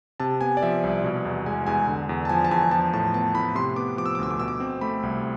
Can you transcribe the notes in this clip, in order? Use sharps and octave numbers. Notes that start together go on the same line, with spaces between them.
C3 A5
B3 G#5
D5
F3 E5
C2
B2
E2
G#3 G#5
E2 G#5
D3
E2
A5
F3 G#5
A5
E2 G#5
F3 A5
A2 A5
B3 A5
A2 B5
C3 C6
B3 D6
F3 D6
E6
D6
D2 E6
D6
B2 E6
D6
C4
A3 B5
C2